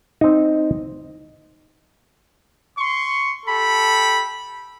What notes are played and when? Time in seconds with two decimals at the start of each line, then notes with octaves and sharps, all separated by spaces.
0.21 C4 D#4
2.78 C6 C#6
3.46 G4 A4 B5